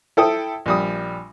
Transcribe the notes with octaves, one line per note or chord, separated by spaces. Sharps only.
E4 A4 G5 D#6
A#1 G3 D#6